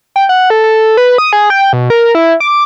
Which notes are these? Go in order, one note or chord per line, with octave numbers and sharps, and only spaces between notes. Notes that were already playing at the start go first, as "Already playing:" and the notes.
G5
F#5
A4
A4
B4
D#6
G#4
G5
B2
A#4
E4
D6